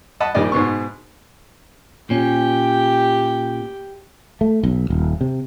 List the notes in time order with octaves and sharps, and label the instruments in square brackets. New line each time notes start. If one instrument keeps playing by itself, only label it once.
[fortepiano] D#5 F#5 A5 B5
A#1 D#3 G3 A#3 D5 D#5
G#2 B2 B3 C#6
[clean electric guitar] A#2 C#4 [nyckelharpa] G4 G5
[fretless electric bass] A3
B1
D#1
C3